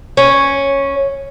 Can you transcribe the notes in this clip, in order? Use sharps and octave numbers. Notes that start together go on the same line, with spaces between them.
C#4